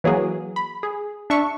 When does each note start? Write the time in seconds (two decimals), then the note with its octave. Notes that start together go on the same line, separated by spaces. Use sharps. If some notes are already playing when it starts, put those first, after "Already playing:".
0.04 E3 F#3 A#3 G#4
0.56 B5
0.83 G#4
1.30 D4 E5 C#6